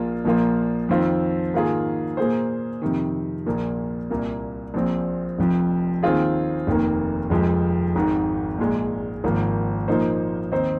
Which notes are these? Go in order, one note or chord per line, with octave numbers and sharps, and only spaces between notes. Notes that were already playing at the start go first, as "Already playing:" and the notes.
Already playing: A#1 A#2 A#3 F4
A#1 A#2 F3 A#3 F4
F2 D#3 C4 F4
G#2 D#3 A#3 F4 G#4
A#2 A#3 G#4 C5
F2 C3 D#3
A#1 A#2 A#3
C2 A#2 A#3
A#1 A#2 F3 C4
F1 F2 F3
D#2 D#3 C4 F4 G#4
F1 D#2 D#3 A#3
F1 F2 F3 G#3
G#1 G#2 D#3
A#1 A#2 G#3
G#1 G#2 F3 A#3
A#2 F3 A#3 D#4 C5
D#2 D#3 C4 D#4 C5